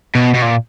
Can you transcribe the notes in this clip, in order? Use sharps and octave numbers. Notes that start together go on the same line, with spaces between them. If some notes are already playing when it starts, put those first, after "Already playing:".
B2
B2
A#2